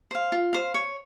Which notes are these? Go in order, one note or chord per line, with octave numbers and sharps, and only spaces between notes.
C5 F5
F4
C5 F5
C#5